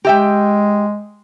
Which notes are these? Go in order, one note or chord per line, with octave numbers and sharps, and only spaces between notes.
G#3 G4 E5 G5